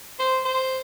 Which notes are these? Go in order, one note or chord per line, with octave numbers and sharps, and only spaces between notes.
C5
C5